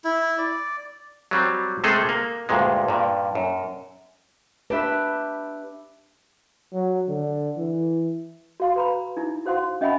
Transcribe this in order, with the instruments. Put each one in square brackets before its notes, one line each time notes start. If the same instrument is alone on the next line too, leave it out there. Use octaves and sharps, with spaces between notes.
[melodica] E4
D5
[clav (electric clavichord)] F#3 G3 C4
C3 G#3 A3 G#4 A4 C5
A#3
D2 G2 A#2 G#3
G2 A#2
F#2
[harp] D4 G4 E5 [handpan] B4
[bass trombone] F#3
D3
E3
[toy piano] F#4 F5 C6
B4 A#5 B5
D#4 E4
F#4 C5 F5 F#5 C6
C#4 D#5 E5 F#5 G#5 B5